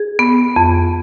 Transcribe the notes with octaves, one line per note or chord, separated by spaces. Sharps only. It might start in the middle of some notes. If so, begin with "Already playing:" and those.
Already playing: G#4
B3
F2